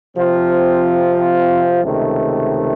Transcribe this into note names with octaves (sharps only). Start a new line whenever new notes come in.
C3 F3 C4 F4
C#2 C3 D#3 A3